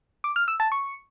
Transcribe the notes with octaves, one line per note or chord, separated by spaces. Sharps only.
D6
F6
E6
A5
C#6